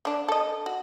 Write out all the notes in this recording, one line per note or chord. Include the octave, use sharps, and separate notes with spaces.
D3 D4
A4 D#5
F#4